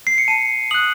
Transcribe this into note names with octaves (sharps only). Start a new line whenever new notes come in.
C7
C#7
A5 D#7
D#6 F#6 F#7